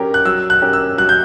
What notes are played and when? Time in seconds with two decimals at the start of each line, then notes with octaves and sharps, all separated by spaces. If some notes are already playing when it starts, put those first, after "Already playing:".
Already playing: F#3 C#4 G4 A#4
0.14 F#6
0.25 F#3 E6
0.50 F#6
0.62 C#4 G4 A#4
0.73 E6
0.98 F#3 F#6
1.09 G6